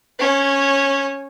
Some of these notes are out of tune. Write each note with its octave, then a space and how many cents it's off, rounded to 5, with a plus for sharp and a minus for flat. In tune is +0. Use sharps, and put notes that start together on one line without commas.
C#4 +0 C#5 -15